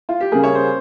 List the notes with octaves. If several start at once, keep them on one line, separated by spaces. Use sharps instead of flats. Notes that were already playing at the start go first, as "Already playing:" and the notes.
F4
G4
C#3 G3 A#3 G#4
C#5
C5